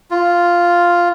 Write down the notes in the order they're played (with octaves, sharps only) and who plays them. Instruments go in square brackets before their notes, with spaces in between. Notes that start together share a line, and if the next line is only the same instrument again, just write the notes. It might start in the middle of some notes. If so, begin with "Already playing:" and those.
[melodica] F4